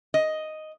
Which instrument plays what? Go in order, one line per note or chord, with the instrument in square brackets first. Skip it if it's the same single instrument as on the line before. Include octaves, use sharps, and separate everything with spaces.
[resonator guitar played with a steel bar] D#5